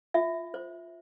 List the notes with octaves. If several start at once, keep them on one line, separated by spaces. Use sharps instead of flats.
F4 E5
C5